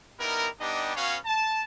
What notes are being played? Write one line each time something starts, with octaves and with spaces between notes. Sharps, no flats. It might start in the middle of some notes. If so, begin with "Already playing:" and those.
G3 B3 D#4 E4 A#4
G3 B3 D4 D#4 G4 D#5
B3 C#4 F#4 C#5 F5
A5